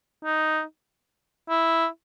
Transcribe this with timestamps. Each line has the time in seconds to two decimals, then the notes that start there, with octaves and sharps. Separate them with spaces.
0.25 D#4
1.49 E4